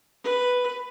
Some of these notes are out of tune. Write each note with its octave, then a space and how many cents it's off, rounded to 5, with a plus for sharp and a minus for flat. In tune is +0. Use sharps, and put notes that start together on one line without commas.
B4 +0